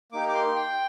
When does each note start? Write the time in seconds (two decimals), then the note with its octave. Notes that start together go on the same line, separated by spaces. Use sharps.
0.12 A#3 D#4 G4 D6
0.29 D6
0.34 C6
0.56 G5